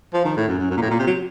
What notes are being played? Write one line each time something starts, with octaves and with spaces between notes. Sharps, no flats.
F3
D#3
A2
F#2
F#2
F#2
A#2
A2
A#2
C3
F#3